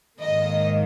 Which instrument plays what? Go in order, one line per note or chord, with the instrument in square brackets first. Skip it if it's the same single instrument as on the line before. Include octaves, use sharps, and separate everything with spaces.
[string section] G#2 D#3 A#3 D#5